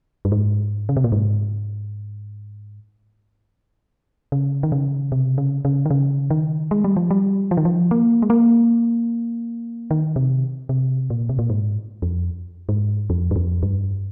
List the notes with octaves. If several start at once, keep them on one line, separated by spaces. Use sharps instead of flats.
G2
G#2
C#3
C3
A#2
G#2
C#3
D#3
C#3
C3
C#3
C#3
D#3
C#3
D#3
G#3
G3
F3
G3
F3
D#3
F3
A#3
G#3
A#3
D#3
C3
C3
A#2
C3
A#2
G#2
F2
G#2
F2
G2
F2
G2